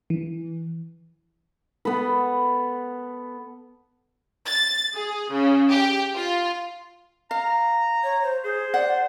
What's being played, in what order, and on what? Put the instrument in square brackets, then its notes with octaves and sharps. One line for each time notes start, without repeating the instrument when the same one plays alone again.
[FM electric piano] E3
[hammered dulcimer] B3 A4 B4
[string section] A6
G#4
C#3
G4
F4
[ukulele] F5 [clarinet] A#5
[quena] C#5
C5
[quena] G#4 [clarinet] C5
[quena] D5 [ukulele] F#5